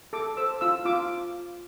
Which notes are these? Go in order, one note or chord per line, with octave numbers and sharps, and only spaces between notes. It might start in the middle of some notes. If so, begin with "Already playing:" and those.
A4 D6
C5 E6
F4 E6
F4 D6